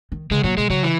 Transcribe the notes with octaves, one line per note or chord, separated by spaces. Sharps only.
D#3
C#3 G#3
A#2 F#3
B2 G#3
C#3 F#3
E3